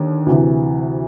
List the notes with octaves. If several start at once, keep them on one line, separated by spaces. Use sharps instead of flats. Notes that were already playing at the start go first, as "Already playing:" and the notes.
Already playing: D#2 D3
D2 C3 E3